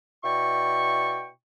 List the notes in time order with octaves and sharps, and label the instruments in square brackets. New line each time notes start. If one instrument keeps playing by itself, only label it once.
[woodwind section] B2 E4 D5 G5 C#6